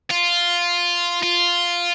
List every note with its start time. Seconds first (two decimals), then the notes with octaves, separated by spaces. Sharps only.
0.11 F4
1.23 F4